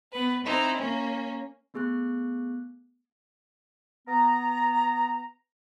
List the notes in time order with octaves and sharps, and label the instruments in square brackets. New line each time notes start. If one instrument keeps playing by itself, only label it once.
[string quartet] B3 B4
C4 D#4 E4
A#3 C#4
[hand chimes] A3 B3 G#4 C#6 F#6
[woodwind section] B3 A#5